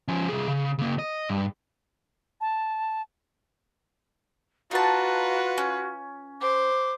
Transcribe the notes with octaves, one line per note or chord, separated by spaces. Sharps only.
F3 C#4
C2 G#4
C#3
C#3 A#3
D#5
G2
A5
D#4 F4 F#4 B4 A5
C#4
C5 D6